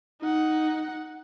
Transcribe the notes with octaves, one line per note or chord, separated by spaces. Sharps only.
D#4 F#5